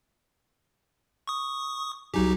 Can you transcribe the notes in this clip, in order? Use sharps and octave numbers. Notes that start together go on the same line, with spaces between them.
C#6 D#6
C2 F#3 D#4 G4 G#4